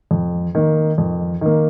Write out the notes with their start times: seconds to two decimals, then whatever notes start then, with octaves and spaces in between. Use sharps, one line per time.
0.11 F2
0.55 D#3 A#3
0.98 F2
1.41 D#3 A#3